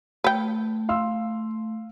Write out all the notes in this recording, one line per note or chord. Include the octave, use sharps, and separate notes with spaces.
A3 B4 G5
F5 C6 E6